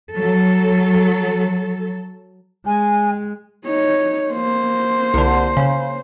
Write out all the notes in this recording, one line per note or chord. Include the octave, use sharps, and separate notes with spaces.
F#3 A4
G#3 G#5
D#4 C#5
A#3 C5
C2 D3
C#3